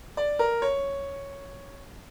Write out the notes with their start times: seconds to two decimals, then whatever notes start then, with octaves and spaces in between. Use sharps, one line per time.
0.17 D5
0.39 A#4
0.62 C#5